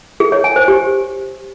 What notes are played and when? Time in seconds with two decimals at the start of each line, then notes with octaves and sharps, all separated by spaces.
0.20 G#4
0.32 C#5
0.44 G#5
0.56 C5
0.68 G4